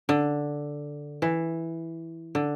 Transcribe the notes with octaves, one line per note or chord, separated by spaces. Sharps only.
D3
E3
D3